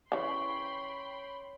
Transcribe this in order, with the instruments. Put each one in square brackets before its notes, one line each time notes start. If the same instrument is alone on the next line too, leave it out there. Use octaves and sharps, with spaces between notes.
[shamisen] C#3 E3 [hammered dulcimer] C#5 [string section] G5 B5 C6